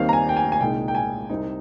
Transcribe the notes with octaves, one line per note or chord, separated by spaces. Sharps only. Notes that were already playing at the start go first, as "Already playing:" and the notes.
Already playing: D#2 D#3 G3 C4 F5
A#5
G#5
G5
G#5
G#5
C2 A#2 G#3 D#4 G5
G5
G#5
C2 C3 G3 C4 D#4